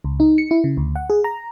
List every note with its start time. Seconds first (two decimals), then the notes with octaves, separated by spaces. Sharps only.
0.04 C#2
0.20 D#4
0.38 C#7
0.51 E4
0.64 C#3
0.77 D2
0.96 F#5
1.10 G#4
1.24 A#5